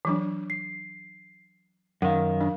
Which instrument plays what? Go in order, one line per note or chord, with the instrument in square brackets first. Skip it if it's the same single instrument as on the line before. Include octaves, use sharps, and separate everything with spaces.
[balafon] E3 F#3 D4
[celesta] C7
[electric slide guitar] F#2 D#3 [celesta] A#4 F5 [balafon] F#5
[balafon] D4